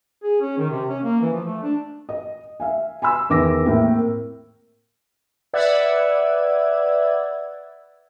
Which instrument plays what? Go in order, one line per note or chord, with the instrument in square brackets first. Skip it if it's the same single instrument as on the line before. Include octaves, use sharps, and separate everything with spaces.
[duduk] G#4
C#4
D#3
C3
C#4
A#3
E3
F3
A3
D4
[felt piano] D#5
E5 F5 G#5
G#5 B5 C6 E6
E2 D#3 D6 A#6
A2 A#3 C4
[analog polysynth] B4 D5 E5 F#5 E6 G#6